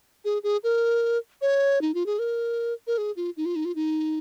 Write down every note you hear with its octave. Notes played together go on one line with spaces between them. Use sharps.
G#4
G#4
A#4
C#5
D#4
F4
G#4
A#4
A#4
G#4
F4
D#4
F4
D#4
F4
D#4